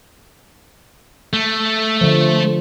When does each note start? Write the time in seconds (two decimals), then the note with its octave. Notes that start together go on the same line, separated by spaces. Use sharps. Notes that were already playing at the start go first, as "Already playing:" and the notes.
1.33 A3
2.01 D3 F3